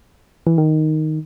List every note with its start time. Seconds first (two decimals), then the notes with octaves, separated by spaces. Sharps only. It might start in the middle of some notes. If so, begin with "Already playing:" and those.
0.47 E3
0.58 D#3